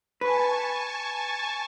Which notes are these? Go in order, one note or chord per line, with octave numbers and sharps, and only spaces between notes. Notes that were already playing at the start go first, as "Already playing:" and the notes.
B4 G#5 A5 C#6